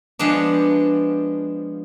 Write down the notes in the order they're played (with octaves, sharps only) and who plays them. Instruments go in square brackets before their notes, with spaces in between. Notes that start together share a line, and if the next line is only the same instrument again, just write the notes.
[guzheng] F3 G#3 B3 D4